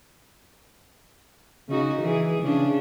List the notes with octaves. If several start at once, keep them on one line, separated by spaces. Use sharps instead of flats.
C#3 D#4 F#4
E3 G#4
C#3 D4